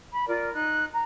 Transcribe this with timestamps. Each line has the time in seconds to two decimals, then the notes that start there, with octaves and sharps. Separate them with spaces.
0.13 B5
0.27 F4 A#4 D5
0.52 D#4 F#6
0.93 A#5